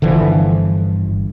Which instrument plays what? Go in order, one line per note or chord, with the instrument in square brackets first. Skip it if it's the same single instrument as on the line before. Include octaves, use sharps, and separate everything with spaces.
[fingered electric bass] G1 [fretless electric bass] D3 E3 F3